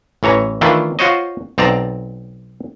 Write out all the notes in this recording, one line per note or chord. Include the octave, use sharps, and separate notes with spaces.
A1 E3 C#5 A#5
D#3 E3 A3 D4 E4 F4
F4 F#4 C5 C#5 D#5
B1 C4 D5 A5 A#5